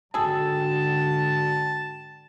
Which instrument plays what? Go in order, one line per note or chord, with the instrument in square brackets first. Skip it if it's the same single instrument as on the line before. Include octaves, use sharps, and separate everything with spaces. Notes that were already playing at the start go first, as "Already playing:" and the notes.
[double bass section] G#2 D3 [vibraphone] F#4 G5 [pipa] G#4 A4 [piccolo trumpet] A5